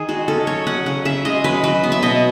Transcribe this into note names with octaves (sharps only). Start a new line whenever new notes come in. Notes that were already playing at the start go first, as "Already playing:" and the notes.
Already playing: D#3 G#4
G#3 F#4
C#4 A4
F#3 C#5
C#4 F#5
C#3 F#5
C#3 E5
G#3 D#5
F#3 B4
F#3 B4
B3
E5
B2 D#5